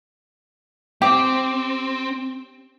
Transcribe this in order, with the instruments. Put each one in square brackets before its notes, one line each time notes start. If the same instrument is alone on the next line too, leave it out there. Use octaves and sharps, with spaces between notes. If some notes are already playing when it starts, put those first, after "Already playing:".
[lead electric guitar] C4 [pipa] G4